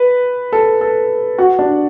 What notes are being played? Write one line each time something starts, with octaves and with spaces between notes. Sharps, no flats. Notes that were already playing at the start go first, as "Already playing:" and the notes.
Already playing: B4
A4
A4
F#4
D4